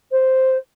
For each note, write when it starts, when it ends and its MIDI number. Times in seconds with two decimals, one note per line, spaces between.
0.11 0.57 72